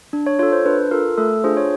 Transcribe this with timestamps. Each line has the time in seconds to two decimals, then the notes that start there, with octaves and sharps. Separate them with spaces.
0.13 D4
0.26 C#5
0.39 F4 A4 C#5
0.52 C5
0.66 D4 B4
0.91 F4 A4 A#4
1.18 A3 A4
1.44 D4 F4 G#4 C5
1.57 C#5